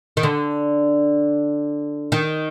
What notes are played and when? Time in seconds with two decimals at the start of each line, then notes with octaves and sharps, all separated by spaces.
0.17 D#3
0.23 D3
2.12 D#3